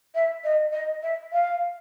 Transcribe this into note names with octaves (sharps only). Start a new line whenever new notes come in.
E5
D#5
D#5
E5
F5